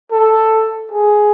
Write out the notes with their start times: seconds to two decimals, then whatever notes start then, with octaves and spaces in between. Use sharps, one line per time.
0.12 A4
0.91 G#4